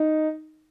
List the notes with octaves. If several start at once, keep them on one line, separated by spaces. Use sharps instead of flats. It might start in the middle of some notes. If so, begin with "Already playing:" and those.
Already playing: D#4